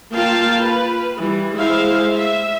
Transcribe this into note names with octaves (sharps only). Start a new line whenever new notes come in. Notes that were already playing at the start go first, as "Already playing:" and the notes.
A#3 F4 F5 G5 A5
B4
E3 G3
G#3 E4 C5 E5 F5
E5